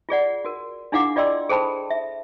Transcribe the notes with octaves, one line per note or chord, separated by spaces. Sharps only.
F4 G#4 D5 F#5
F#4 A#4
D4 E4 G#4 F5 F#5 D6
F4 D5 D#5 G5 C6 E6
G#4 A4 C5 G5 A5 B5
E5